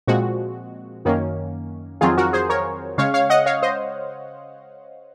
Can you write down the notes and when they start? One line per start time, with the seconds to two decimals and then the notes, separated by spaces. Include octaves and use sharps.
0.07 A#2 F3 G#3 C4 F#4
1.05 F#2 D#3 A#3 C#4
2.01 F2 D#3 F#3 C4 F4 G#4
2.17 F#4 A#4
2.33 G#4 C5
2.50 A#4 C#5
2.98 C#3 G#3 C#4 C#5 F5
3.14 C#5 F5
3.30 D#5 F#5
3.46 C#5 F5
3.62 C5 D#5